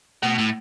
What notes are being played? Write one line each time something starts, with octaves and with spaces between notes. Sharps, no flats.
B2 A3
A2